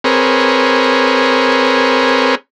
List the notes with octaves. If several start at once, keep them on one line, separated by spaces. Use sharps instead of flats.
C4 G#4 A#4 B4 C#5